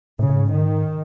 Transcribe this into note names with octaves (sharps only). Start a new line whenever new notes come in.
A2 C#3
A2
G#2
D#3